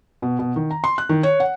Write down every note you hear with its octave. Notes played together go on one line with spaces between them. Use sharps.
B2
B2
D#3
A#5
C6
F#6
D#3
C#5
F#5